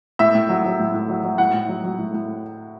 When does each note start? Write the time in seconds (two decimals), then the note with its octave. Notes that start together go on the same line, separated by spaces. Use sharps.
0.19 A2 E5
0.35 A2
0.49 F#3
0.65 F#3
0.79 A2
0.94 A2
1.09 F#3
1.24 F#3
1.38 A2 F#5
1.54 A2
1.69 F#3
1.84 F#3
1.98 A2
2.14 A2